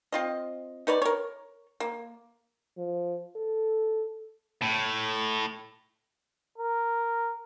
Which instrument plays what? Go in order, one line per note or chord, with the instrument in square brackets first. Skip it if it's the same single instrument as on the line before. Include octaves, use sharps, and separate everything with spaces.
[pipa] C4 F4 D#5
D#4 B4 C#5 D5
A#4 C#5
A#3
[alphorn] F3
A4
[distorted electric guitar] A2
[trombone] A#4